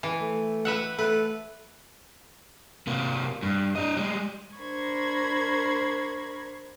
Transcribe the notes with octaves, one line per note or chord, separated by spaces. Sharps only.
E3
A3
B4 E5 F#5
A3 B4
C3 A#3
G2
D4 D#5
G3 G#3
D4 A#4 C5 B5 C#6 G#6